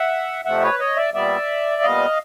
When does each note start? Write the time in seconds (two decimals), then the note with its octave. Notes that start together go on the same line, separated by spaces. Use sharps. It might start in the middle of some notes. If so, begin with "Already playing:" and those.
Already playing: E5 F#5
0.45 F2 C3 F3 A3 C4 E5 F#5
0.62 B4 C#5
0.80 C#5 D#5
0.97 D5 E5
1.14 A#2 G3 B3 D5 E5
1.82 A#2 G3 B3 D#5 F5